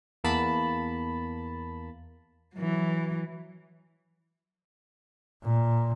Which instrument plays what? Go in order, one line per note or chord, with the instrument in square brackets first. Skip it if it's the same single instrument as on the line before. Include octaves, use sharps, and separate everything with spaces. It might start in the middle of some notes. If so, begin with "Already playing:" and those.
[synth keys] E2 A#3 A5 B5
[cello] E3 F#3
[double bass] A#2